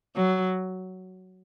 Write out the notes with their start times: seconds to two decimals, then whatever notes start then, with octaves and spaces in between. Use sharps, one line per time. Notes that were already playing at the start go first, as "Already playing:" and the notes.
0.16 F#3